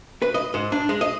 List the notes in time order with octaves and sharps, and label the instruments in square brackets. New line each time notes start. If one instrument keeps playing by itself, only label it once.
[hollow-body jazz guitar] B4
D#5
G#2
D4
G#3
D#5